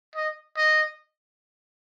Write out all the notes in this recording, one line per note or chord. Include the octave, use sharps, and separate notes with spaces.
D#5
D#5